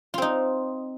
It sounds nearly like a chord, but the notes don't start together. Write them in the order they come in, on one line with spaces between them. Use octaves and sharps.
F4 C4 D#4